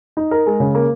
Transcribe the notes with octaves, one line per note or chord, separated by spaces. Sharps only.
D#4
A#4
G#3
C#3
A#3